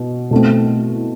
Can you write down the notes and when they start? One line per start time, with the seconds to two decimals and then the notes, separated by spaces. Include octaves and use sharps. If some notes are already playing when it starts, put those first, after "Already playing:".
Already playing: B2
0.31 B2 A3 C4